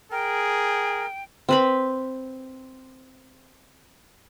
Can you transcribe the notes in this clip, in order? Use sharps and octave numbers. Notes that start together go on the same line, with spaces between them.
G#4 A#4 G5
C4 B4 B5